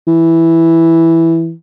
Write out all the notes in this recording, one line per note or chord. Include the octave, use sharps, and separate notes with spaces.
E3